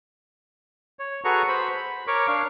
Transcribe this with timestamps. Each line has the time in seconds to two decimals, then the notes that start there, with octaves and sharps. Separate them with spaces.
0.99 C#5
1.24 F#4 G#4 A4 B4 A#5 C#6
1.48 C5 B5
1.77 B5
2.07 A#4 C#5 C#6 D6
2.28 D4 F5